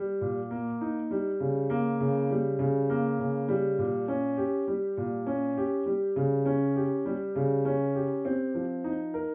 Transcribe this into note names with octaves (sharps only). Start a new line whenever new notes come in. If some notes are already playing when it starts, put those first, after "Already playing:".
Already playing: G3
A#2
A#3
D#4
G3
C#3
A#3
C#3
G3
C#3
A#3
C#3
G3
A#2
C#4
G4
G3
A#2
C#4
G4
G3
C#3
C#4
G4
G3
C#3
C#4
G4
C4
F3
D#4
A#4